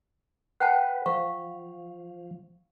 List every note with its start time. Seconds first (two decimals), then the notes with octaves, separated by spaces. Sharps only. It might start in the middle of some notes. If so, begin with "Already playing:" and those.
0.60 B4 F#5 G5 A5
1.06 F3 F5 C#6